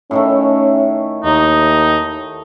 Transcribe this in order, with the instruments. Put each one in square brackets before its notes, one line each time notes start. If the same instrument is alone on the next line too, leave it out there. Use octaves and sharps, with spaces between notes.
[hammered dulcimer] A2 D#3 A3 [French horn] C#4
[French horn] D#2 [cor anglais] D#4